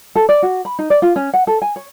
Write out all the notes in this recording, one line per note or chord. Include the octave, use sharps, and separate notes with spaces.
A4
D5
F#4
B5
D#4
D5
F4
C#4
F#5
A4
G#5
C#5